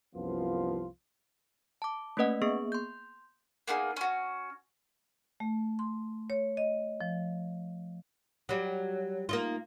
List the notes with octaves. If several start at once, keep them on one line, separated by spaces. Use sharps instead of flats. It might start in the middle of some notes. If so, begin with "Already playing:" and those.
C2 F#2 F3 B3 F4
A5 D6
A3 A#3 C#4 B4 D#5 F#5
A#3 B3 G#4 C#6
C6 G6
A#3 B3 D#4 G#4
C#4 F#4
A3
C6
C#5
D#5
F3
F#3 G3
A#3 D#4 F4